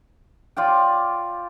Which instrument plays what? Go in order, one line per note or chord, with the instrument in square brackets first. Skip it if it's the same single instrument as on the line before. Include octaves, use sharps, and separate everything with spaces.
[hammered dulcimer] F4 D5 G5